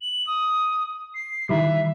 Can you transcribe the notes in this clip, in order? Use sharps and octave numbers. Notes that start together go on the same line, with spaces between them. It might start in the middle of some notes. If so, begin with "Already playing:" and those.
F#7
D#6
C7
D#3 E3 G3 E5